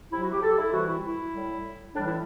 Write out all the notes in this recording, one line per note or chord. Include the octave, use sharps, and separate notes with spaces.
C3 F#3 E4
F#4
G4
A4
E4
C3 E3 G3 F#4
E4
E4
A2 G3
A2 E3 G3 D4
E4